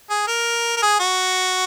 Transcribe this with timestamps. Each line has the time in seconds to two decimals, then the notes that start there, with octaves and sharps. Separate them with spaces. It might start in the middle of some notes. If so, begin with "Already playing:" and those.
0.10 G#4
0.27 A#4
0.77 A#4
0.82 G#4
1.00 F#4